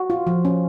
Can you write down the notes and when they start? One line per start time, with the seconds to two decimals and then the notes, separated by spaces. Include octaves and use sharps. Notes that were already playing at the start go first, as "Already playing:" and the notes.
Already playing: F#4
0.10 F4
0.27 F3
0.45 C#4